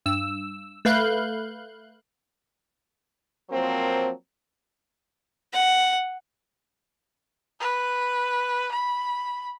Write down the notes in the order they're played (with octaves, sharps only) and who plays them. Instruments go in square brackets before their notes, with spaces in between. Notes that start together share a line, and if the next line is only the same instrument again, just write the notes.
[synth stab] G2 E6
A3 B4 F5 F#6 G6
[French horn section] F3 F#3 A#3 C4 A#4 C5
[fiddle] F#5
[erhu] B4
B5